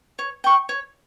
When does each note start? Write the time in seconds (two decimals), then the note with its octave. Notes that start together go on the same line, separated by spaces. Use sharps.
0.19 C#5
0.44 G5 C#6
0.69 C#5